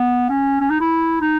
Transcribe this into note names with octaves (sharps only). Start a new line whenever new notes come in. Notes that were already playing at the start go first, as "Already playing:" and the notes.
Already playing: B3
C#4
C#4
D#4
E4
D#4